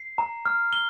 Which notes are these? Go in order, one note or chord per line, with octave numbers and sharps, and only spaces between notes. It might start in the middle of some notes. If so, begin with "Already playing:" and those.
Already playing: C7
A#5
F6
G7